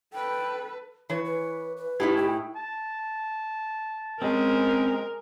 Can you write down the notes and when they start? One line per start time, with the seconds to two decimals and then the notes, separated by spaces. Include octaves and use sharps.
0.13 A4 B4 G5
1.10 E3 B4 C#5
1.25 B4
1.77 B4
2.00 A2 D#4 E4 G4 G#5
2.17 G5
2.56 A5
4.22 G#3 C4 C#4 A#4